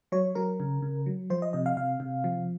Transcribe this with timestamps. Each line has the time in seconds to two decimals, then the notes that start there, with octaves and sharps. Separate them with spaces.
0.12 F#3 C#5
0.35 F#3 A#4
0.60 C#3
0.82 C#3
1.06 F#3
1.30 F3 C5
1.42 D#5
1.53 C3 D#5
1.66 F5
1.77 C3 F5
2.00 C3
2.24 F3